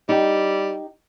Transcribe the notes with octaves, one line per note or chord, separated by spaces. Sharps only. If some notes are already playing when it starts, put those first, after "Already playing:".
G3 D#4 G4